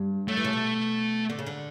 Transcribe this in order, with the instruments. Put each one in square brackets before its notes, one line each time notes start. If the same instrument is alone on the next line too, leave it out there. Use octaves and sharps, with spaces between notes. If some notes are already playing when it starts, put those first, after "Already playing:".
Already playing: [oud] G2
[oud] F#3 [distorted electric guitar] A3
[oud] E3
C#3
B2
D3
C#3
D3